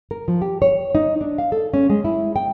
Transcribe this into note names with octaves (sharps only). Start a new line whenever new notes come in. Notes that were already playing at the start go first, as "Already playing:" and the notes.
A#4
F3
G4
C#5
D#4
D4
F5
A4
C#4
G#3
E4
G5